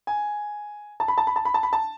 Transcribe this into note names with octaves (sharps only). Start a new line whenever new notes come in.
G#5
A5
B5
A5
B5
A5
B5
A5
B5
A5